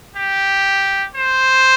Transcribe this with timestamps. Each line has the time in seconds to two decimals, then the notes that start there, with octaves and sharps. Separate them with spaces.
0.16 G4
1.15 C5